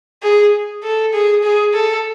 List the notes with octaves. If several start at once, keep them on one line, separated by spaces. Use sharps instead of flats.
G#4
A4
G#4
G#4
A4